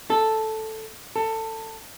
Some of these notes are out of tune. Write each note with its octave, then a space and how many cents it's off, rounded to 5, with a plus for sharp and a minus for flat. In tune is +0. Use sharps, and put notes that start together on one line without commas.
A4 +0
A4 +20